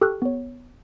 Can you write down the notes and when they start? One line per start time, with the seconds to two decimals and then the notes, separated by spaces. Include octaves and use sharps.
0.01 G4 A4 G5 C#6 F6 F#6
0.22 B3 C#5